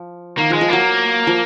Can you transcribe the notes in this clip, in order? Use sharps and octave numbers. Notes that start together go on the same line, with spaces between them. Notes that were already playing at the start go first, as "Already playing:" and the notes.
Already playing: F3
D#3 A#3
F3 G#3
F3
F#3 A#3
F3